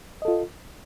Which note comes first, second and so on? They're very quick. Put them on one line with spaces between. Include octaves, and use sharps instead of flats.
D#5 A4 F4